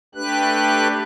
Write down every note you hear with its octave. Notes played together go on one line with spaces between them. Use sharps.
A3 D4 G4 B4 F#6